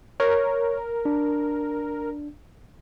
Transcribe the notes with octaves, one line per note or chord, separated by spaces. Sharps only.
A#4 C#5
D4